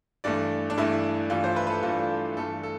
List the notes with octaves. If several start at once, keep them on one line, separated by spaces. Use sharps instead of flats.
G2 E3 A3 D5
D4
G2 E3 A3 E4
G2 E3 A3 F4
C5
B4
B4
A4
G2 E3 A3 F4
G2 E3 A3 A4
A4